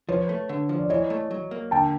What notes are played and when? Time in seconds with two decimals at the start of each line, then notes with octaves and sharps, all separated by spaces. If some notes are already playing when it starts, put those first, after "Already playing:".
0.08 F3 B4 C#5
0.29 A3
0.49 D3
0.69 F3
0.78 D5
0.90 E3 C#5 D#5
1.10 A3
1.31 F#3
1.51 A#3
1.71 D3 G5 A5